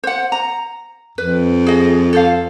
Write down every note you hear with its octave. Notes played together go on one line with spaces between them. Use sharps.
C5 F#5
A#5
F2 B4
G#4 D#5
A4 C5 F5